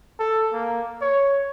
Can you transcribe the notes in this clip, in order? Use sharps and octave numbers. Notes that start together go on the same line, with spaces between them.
A4
A#3
C#5